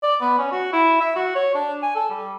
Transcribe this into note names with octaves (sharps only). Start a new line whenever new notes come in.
D5
B3
C#4
F#4
E4
E5
F#4
C#5
D4
G#5
A4
G3